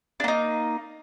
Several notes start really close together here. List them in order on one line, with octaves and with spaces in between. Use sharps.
D4 A#3 D#4